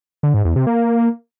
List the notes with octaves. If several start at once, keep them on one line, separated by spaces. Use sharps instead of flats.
D3
G#2
E2
C3
A#3